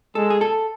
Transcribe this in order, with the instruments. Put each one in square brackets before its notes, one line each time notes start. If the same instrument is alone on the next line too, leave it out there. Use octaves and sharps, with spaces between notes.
[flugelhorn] G#3 [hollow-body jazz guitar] A4
[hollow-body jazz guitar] G#4
A4